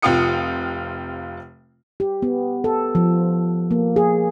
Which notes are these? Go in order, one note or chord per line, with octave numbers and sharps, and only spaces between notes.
F1 C3 F4 G5 D#6 C#7
G4
B3
A4
F3
A#3
G#4